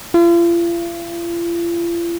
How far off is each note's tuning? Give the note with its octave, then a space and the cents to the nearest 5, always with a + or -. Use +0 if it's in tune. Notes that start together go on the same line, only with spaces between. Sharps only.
F4 -40